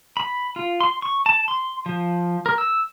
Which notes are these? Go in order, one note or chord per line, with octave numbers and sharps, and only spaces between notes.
B5
F4
C6
C#6
A5
C6
F3
A#4
E6